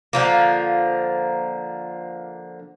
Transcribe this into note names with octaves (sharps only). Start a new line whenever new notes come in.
D3 F3 A#3